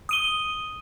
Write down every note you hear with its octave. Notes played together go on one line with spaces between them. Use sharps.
D#6 D#7 G7